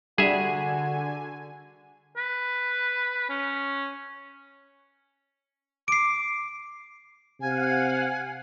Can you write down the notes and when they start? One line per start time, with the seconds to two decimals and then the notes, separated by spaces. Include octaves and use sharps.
0.18 D3 G3 F#4 G#4 E5 G#5
2.17 B4
3.29 C#4
5.88 D6 C7 D7
7.41 C3 F5 F#5 G#5